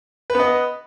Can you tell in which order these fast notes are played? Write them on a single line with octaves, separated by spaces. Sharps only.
B4 B3 D#5